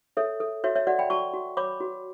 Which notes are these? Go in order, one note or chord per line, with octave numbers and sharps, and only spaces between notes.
A4 C#5 E5
A4
F#4 C#5 E5
C#5 E5
F#4 D5 F#5
G5 B5
F#4 A5 C#6
F#4
C#5 B5 D6
F#4